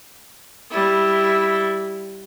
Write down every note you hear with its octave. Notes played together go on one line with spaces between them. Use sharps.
G3 E4